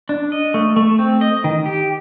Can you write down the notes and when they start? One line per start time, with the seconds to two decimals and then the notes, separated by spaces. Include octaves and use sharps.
0.09 D4
0.32 D#5
0.54 A3
0.76 A3
0.99 C4
1.21 D#5
1.44 D#3
1.66 G4